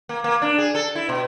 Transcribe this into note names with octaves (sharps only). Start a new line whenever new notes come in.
A#3
A#3
D4
G#4
A4
E4
B2